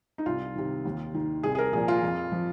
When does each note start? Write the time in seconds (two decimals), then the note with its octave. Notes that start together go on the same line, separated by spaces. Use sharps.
0.18 D#4
0.26 C2 F4
0.55 C3 D#3
0.85 D#2
1.14 D#3
1.43 C2 G#4
1.55 G#4
1.58 A#4
1.73 A#2 F3 G#4
1.88 F4
2.02 F2
2.32 F3